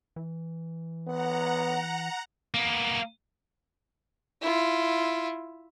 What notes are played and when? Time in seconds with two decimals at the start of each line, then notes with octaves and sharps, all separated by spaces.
0.16 E3
1.07 B3 F#5 A#5
2.54 A#3 B3
4.41 E4 F4